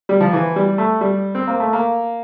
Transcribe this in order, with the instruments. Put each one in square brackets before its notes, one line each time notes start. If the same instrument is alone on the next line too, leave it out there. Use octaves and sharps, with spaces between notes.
[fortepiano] G3
F3
E3
G3
A3
G3
C4
A#3
A3
A#3